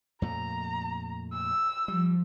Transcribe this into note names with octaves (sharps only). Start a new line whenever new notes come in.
F2 A#2 A3 A#5
E6
F3 G3